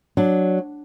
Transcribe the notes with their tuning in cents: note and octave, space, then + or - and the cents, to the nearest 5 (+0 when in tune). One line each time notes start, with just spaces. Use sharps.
F#3 +0 D4 +0